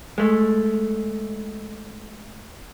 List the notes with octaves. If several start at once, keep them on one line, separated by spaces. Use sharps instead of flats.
G#3 A3